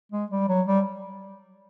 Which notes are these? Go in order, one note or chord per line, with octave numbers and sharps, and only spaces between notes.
G#3
G3
F#3
G3